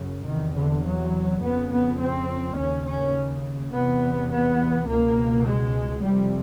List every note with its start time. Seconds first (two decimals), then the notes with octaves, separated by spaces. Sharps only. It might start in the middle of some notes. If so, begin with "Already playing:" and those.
Already playing: F#2 C#3
0.27 E2 C3 D#3
0.57 D3
0.85 F#3
1.42 F2 C#3 B3
1.71 B3
2.00 C4
2.57 D#2 C#3 C#4
2.86 C#4
3.73 E2 C3 B3
4.30 B3
4.87 C#2 B2 A#3
5.45 G#3
6.03 F2 C3 G3